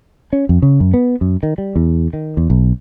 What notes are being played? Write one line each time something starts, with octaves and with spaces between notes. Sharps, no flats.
C#4
F2
C#3
F#2
B3
F#2
D#3
G3
E2
D#3
E2
B1